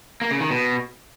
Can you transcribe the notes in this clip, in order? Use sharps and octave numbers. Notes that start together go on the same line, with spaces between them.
A#3
C#3
D#3
B2